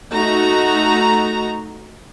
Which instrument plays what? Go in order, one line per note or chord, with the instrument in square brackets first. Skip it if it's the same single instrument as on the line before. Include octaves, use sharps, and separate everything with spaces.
[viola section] A3 D#4 F#4 A#5